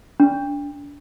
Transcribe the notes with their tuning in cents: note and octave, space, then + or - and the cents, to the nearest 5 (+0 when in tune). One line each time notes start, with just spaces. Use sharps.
D4 -25